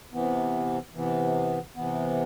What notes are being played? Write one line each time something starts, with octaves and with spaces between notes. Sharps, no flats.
C3 E3 B3
C3 E3 B3
C3 E3 B3